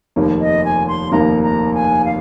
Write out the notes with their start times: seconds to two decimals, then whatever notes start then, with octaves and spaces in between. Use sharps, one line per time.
0.16 F1 D#2 D#3 A#3
0.41 D#5
0.64 G#5
0.87 C6
1.12 F1 D#2 D#3 A#3 A#5
1.43 A#5
1.74 G#5
2.05 F5